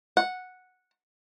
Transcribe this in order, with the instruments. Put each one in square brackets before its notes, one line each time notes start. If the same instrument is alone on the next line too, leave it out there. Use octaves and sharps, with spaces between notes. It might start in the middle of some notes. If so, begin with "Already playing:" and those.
[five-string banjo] F#5